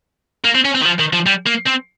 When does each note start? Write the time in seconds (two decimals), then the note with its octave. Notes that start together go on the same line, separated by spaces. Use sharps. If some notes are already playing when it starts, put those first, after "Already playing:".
0.44 A#3
0.55 C4
0.65 C#4
0.75 C4
0.81 D#3
0.85 F3
0.99 D#3
1.13 F3
1.26 G3
1.47 A#3
1.67 C4